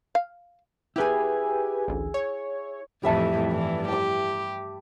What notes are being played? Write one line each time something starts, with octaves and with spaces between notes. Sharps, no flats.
F5
E4 G4 G#4 B4 G#5
A1 D2
C#5
F2 A2 E3 G3 E5 A5
G2 E3
G4 A5 D6